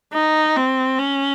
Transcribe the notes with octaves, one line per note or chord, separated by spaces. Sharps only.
D#4
C4
C#4